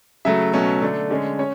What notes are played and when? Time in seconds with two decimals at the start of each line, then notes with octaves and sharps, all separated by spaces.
0.25 C#3 F#3 A3 E5
0.53 B2 F#3 A3 C#4
0.82 D3 A3 D4
1.10 D3 G#3 C#4
1.39 C#4 C#5